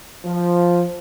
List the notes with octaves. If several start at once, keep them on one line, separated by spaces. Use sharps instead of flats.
F3